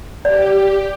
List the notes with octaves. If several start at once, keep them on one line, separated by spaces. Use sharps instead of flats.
G4 D5